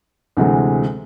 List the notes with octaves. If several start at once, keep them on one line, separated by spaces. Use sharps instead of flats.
D2 C3 E3 G#3